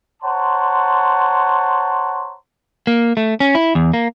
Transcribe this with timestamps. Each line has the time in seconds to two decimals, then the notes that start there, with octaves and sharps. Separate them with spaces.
0.23 C5 C#5 F#5 A5 A#5 C6
2.87 A#3
3.17 A3
3.40 C#4
3.55 E4
3.75 E2
3.93 A#3